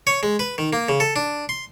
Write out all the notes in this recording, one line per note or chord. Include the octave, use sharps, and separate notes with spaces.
C#5
G#3
B4
D#3
A#3
C#3
A4
D4
C6